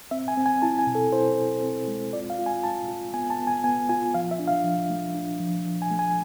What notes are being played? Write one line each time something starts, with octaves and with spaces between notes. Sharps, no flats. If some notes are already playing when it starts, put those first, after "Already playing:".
C4 E5
G#5
C4
G#5
E4 A5
G#5
B2
A4
E4 C5
E4
C4
G#3
F4 D5
F5
F4
G#5
F4 A5
F4
B3 G#5
A5
B3
G#5
B3 G#5
F4 G#5
F3 F5
E5
D4
F5
F3
A3
D4
F3
F3
G#5
A3
G#5